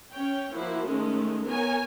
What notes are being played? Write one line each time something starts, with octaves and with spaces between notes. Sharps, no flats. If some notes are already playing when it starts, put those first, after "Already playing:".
C#4 C#5 G5
F3 A#3 E4 F#4
D#3 G#3 A3 C#4
B3 A#4 C#5 G#5